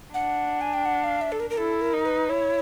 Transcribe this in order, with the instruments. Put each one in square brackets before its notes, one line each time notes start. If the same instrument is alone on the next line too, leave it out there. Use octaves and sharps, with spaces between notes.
[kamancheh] D4 [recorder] F#5
[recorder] G#5
G5
F#5
F5
E5
A4
A#4
A#4
[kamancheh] E4 [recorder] A4
[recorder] A#4
[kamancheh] D#4
[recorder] B4
[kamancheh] E4 [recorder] C#5